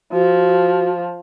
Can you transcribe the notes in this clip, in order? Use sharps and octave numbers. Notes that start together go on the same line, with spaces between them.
F3 F#4